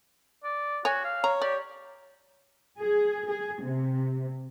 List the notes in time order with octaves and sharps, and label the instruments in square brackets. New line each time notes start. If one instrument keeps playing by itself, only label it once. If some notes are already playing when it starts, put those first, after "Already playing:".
[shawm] D5
[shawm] F#4 [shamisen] C#5 G#5
[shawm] F5
[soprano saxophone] C#5 [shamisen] A#5
[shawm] G4 [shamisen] D5
[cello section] G#4
G#4
C3